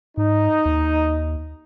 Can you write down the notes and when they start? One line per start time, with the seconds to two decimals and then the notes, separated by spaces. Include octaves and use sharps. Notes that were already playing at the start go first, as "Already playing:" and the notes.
0.18 G#2 D#4
0.66 D#2